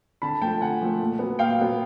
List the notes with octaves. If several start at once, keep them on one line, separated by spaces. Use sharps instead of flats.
D3 A5 B5
F3 A3 G5 A5
D3 F#5 G#5
F3 A3
A#2
F#3 B3
A#2 F5 G5
F#3 B3